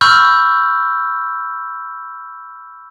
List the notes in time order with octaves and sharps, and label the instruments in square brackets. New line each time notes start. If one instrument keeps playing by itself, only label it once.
[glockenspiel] B5 C#6 E6 F6 G6